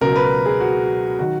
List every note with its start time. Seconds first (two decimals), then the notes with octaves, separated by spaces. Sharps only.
0.01 C#2 B2 F#3 A#4
0.16 B4
0.46 G#4
0.60 F#4
1.19 D#3 F#3 F#4